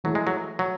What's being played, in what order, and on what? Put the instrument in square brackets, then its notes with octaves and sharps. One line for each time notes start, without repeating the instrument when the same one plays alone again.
[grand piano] E3 A3 E4 G#4 [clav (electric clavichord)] F#3
[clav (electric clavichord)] G#3
F#3
F#3